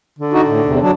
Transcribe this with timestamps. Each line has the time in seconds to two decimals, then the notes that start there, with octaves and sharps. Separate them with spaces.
0.19 D3
0.33 D#4 F#4
0.47 A2
0.65 E2 C3
0.82 F#3 D4